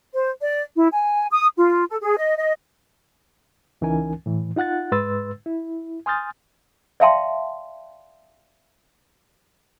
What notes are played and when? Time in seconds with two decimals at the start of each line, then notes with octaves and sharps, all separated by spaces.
0.14 C5
0.40 D5
0.76 E4
0.92 G#5
1.30 D#6
1.56 F4
1.88 A4
2.00 G#4
2.18 D#5
2.37 D#5
3.81 C#2 E3 C#4 D#4 A#4 G#5
4.26 A2 E3
4.56 D#4 F4 F#5 F#6 A6
4.92 G#2 G#3 B4 C6 E6 A6
5.46 E4
6.06 G#5 C6 D#6 F6 G6 A6
7.00 D5 E5 F5 G5 A5 C6